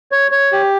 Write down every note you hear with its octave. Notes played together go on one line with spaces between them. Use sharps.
C#5
C#5
G4